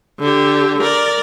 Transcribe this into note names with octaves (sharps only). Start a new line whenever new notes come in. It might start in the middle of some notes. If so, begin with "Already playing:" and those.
D3 G4
A#4 D5